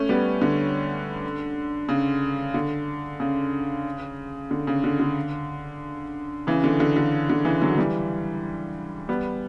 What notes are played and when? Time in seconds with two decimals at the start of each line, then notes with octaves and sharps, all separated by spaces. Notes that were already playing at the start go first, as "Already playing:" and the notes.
Already playing: A3 C#4
0.09 G3 B3
0.42 D3
1.89 C#3
2.54 D3
3.20 C#3
4.51 D3
4.67 C#3
4.84 D3
5.00 D3
6.47 C#3 E3
6.64 D3
6.80 D3
6.97 D3
7.30 D3
7.45 C#3 E3
7.62 D3 F#3
7.78 E3 G3
9.09 G3 B3